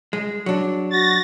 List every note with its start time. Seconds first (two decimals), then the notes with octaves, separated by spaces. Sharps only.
0.13 G#3
0.46 F#3 D4
0.91 F#4 A6 A#6